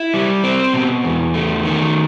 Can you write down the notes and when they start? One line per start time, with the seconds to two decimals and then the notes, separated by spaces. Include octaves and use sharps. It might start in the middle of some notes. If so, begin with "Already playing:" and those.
Already playing: E4
0.14 G3
0.44 C4
0.74 B2
1.04 E2
1.34 A3
1.65 D#3